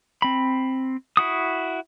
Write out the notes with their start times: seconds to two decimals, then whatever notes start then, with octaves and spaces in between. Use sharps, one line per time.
0.22 C4 B5
1.17 E4 F#4 D#6